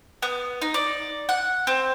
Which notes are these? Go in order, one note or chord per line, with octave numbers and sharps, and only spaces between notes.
B3
D#4
D5
F#5
C4